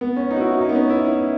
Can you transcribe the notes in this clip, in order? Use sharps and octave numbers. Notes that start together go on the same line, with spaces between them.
B3
C#4
D#4
F#4
E4
F#4
D#4
B3
C#4
E4
E4